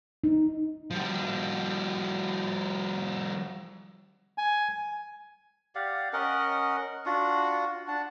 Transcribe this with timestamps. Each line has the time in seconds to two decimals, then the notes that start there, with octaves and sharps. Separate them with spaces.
0.24 D#4
0.90 F3 G3
4.38 G#5
5.75 G4 D5 F5 F#5
6.13 C#4 A#4 D#5 F#5
7.06 D4 F4 F#4 F#5
7.88 D4 F#5 A5